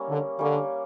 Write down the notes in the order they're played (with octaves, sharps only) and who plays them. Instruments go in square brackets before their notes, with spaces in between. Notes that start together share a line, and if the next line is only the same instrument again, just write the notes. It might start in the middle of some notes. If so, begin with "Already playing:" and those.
Already playing: [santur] G3 A#3 C#4 A#4 E5
[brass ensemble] D3
[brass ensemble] D3 [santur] G3 A#3 C#4